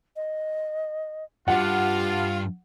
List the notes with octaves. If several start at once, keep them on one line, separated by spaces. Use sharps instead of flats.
D#5
G2 F4 G4 F#5